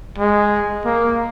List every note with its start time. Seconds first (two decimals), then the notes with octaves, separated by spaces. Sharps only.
0.19 G#3
0.86 A#3